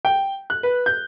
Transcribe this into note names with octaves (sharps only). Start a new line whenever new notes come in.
G5
F#6
B4
G6